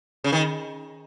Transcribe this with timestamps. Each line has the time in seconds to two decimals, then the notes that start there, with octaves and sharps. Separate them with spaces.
0.24 C#3
0.32 D#3